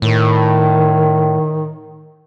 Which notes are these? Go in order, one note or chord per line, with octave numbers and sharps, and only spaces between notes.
A2 D#3